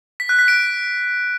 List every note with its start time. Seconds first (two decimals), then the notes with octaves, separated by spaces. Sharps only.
0.20 B6
0.29 F#6
0.39 B6
0.48 D7